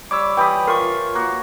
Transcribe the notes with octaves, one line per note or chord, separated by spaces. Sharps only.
G3 C#5 D6 E6
E3 G4 G5 B5 D#6
F4 A#4 C#6
A#3 F#4